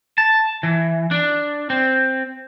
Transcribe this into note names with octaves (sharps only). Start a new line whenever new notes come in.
A5
E3
D4
C4